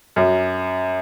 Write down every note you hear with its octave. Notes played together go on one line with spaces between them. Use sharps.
F#2